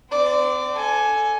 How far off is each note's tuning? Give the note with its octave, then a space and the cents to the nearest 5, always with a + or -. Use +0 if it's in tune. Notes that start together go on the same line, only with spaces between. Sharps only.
C4 -35 D5 +0
A4 +0 G#5 +15